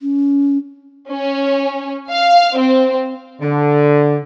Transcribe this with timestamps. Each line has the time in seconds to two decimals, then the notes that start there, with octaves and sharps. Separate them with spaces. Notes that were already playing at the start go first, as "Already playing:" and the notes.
0.02 C#4
1.11 C#4
2.10 F5
2.58 C4
3.41 D3